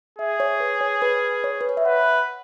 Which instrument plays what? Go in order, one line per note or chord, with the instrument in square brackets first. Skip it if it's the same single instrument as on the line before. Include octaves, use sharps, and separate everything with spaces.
[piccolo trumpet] G#4 [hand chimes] E5
[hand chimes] C#5
B4
C#5
B4
C#5
B4
C#5
E5
[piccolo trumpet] B4 [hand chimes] F#5